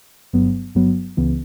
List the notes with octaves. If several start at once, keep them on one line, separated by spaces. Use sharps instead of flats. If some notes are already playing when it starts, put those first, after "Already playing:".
G1 G2 F#3 B3
G1 G2 F#3 B3
C#2 C#3 E3 B3